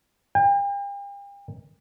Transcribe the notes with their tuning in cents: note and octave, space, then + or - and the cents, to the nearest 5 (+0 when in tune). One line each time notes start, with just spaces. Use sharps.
G5 +40